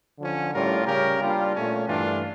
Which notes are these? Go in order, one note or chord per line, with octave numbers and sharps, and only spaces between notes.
D3 F3 C#4
A2 G3 C#4 F4 A#4
C#3 G3 C#4 G4 A#4
G3 A#3 D4 F4
A#2 A3 C#4
G2 E3 A3 D4 F4